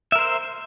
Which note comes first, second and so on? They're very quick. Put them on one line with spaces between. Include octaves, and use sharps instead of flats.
E5 A#4 C5